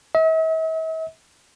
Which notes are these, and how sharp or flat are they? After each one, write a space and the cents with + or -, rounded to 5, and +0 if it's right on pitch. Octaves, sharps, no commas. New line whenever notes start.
E5 -45